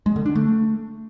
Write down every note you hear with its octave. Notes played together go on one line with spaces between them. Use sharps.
G#3
D3
D4
A3